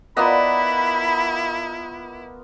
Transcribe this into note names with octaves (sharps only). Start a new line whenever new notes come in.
B3 E4 F4 A#4 D5 D#5 F#5 B5